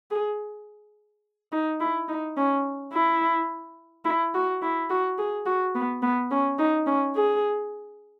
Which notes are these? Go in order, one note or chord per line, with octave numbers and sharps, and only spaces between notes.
G#4
D#4
E4
D#4
C#4
E4
E4
F#4
E4
F#4
G#4
F#4
B3
B3
C#4
D#4
C#4
G#4